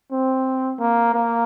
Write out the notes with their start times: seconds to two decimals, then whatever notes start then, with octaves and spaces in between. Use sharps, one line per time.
0.12 C4
0.79 A#3
1.14 A#3